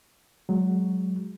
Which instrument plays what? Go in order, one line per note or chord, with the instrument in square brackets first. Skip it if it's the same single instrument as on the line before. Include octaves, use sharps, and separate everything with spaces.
[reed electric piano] F#3 G#3